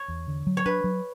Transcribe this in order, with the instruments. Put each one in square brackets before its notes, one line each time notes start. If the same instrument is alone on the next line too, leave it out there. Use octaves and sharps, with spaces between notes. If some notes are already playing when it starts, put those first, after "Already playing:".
Already playing: [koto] C#5
[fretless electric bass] E2
D3
F#3
[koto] C#5
[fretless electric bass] D4 [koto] B4
[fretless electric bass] F#3